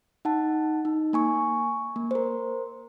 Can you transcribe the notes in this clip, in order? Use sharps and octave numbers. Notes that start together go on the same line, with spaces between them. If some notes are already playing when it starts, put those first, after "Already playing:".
D#4 F#5 A5
D#4
A#3 G#5 C#6
A#3
A#4 C5